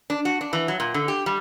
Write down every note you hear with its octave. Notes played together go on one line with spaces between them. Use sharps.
D4
F#4
D4
E3
F#3
A#2
D3
G4
G3